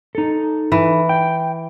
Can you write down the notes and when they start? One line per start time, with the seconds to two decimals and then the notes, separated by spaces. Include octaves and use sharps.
0.15 D#4 A4
0.72 E3
1.09 G5